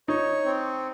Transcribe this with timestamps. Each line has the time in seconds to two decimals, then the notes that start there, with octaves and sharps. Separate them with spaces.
0.08 D#4 C#5
0.45 C4